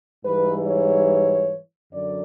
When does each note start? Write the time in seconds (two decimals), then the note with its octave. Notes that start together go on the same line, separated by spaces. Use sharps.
0.25 G#2 E3 G3 B4
0.67 C#5
1.92 F#2 D3 F#3 D5